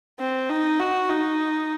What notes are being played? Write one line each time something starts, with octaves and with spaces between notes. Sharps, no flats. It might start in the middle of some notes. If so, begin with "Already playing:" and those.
C4
D#4
F#4
D#4